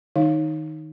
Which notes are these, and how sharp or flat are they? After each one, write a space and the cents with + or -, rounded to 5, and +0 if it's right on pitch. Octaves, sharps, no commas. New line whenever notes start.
D#3 +0 D#4 +0 F5 +0